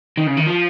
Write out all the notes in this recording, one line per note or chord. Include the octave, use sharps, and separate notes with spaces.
D#3
C#3
D#3
F3